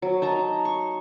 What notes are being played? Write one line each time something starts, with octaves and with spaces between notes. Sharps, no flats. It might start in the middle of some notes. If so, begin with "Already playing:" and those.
F#3
D#4 A5 A#5
C#6